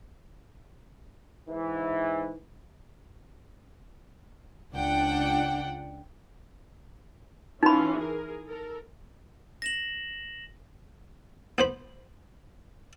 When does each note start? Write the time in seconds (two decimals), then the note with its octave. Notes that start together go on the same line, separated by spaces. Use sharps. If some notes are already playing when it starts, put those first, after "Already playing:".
1.49 G#2 E3
4.72 C#2 D4 F#5 G5
7.63 E3 C#4 D#4 F4 B5
7.98 G#4 A#4
8.47 A4 A#4
9.62 A#6 E7 F#7
11.58 B3 C5 B5